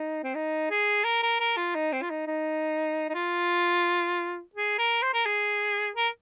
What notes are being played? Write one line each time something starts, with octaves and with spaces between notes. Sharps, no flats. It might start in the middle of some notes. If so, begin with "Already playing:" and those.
Already playing: D#4
C4
D#4
G#4
A#4
A#4
A#4
F4
D#4
C4
F4
D#4
D#4
D#4
F4
G#4
A#4
C5
A#4
G#4
A#4